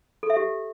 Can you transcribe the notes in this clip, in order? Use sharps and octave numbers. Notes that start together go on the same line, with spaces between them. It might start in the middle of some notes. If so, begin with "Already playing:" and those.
A4
E5
G4